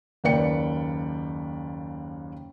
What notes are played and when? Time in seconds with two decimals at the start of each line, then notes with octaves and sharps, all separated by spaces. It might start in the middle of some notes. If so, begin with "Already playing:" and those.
0.24 F#1 D#2 B4 D5 G5 C#7